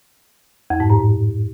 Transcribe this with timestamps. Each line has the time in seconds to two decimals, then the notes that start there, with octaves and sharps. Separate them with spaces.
0.70 F2
0.80 G#2
0.90 A2